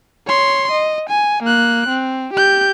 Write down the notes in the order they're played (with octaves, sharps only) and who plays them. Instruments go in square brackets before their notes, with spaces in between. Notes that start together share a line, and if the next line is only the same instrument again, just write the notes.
[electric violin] C#5 C6
D#5
G#5
A#3 F#6
C4
G4 G6